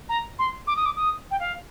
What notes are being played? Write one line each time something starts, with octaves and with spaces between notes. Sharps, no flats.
A#5
C6
D6
D#6
D6
D#6
G5
F5